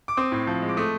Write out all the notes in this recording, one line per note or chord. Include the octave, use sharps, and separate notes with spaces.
D6
C4 D#6
A2
F3
G#3
D6
A3 D#6